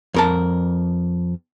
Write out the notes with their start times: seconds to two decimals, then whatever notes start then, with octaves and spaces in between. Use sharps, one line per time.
0.14 F2 A#4 A5